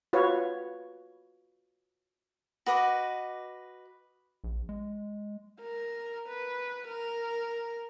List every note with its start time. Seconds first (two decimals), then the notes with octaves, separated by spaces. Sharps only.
0.13 F4 F#4 B4 C#5
2.66 F#4 B4 D#5 D6
4.44 A#1
4.69 G#3
5.61 A#4
6.29 B4
6.88 A#4